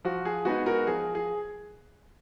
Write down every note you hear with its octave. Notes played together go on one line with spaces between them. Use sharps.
F3 F#4
G#4
G#3 B3 D#4 F#4
F#4 A#4
F3 G#4
G#4